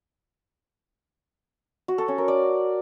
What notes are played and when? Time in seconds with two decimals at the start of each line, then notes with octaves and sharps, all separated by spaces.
1.88 F#4
1.98 A4
2.08 C#4
2.18 A#4
2.28 D5